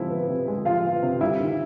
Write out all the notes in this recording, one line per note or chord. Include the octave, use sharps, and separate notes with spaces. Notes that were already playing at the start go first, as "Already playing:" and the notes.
Already playing: C3 F3 G#3 E4
B3
C3
G#3
F3 F4 F5
B3
C3
G3 E4 E5
D#3